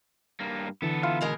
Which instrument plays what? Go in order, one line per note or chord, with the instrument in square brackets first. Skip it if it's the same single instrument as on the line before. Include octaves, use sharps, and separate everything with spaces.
[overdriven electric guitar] G2 A#3
[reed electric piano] D3 E3 [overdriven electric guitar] B3 A4
[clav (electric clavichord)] E4 F4 F5
[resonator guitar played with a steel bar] B2 G#3 A#4